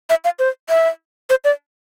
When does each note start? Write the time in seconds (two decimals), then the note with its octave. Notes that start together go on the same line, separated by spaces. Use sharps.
0.10 E5
0.25 F5
0.39 C5
0.69 E5
1.30 C5
1.44 D5